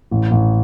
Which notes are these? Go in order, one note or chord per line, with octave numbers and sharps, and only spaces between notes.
A1
A1